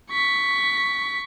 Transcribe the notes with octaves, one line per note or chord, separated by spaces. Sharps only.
C#6 B6